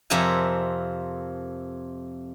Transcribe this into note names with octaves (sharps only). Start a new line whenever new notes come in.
F2 C3 A4 A#4 E5 G#5